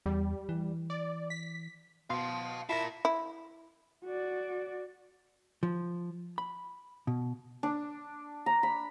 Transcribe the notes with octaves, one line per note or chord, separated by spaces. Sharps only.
E2 G3
E3
D5
B6
B2 F5 A5 C6
E4 F4 A#4 A5 A#6
E4
F#4 D5
F3
B5
B2
D4
A#5
B5